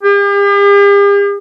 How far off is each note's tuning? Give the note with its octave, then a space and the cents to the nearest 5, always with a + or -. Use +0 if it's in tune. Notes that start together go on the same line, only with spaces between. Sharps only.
G4 +45